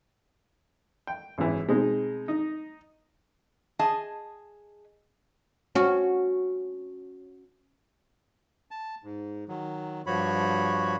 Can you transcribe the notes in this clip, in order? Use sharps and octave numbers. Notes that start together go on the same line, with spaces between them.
G5
G#1 F#2 E3
B2 G#3 C4 D#4
D#4
G#4 D#5 A5
C#4 F#4
A5
G#2
D#3 F#3
G2 F3 F#4 C#5 B5